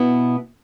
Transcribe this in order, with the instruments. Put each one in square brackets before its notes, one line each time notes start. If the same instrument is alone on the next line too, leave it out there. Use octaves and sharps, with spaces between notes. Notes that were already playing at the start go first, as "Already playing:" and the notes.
Already playing: [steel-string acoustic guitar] B2 B3 E4